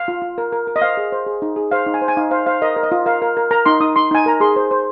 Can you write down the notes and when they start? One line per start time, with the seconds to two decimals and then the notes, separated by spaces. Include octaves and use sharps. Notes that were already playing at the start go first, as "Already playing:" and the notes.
Already playing: F5
0.08 F4
0.22 F4
0.38 A#4
0.52 A#4
0.67 A#4
0.76 D#5
0.82 C5 F5
0.97 G#4
1.12 C5
1.27 G#4
1.42 D#4
1.56 G#4
1.71 C5 F5
1.86 D#4
1.94 G#5
2.02 C5
2.08 G#5
2.17 D#4 F5
2.31 C5 F5
2.46 C5 F5
2.62 A#4 D#5
2.76 A#4
2.83 D#5
2.92 F4
3.06 A#4 F5
3.22 A#4
3.37 A#4
3.51 A#4 A#5
3.66 D#4 C6
3.80 D#4 D#6
3.96 D#4 C6
4.11 D#4 G#5
4.26 A#4 A#5
4.40 G#4 C6
4.56 C5
4.71 C5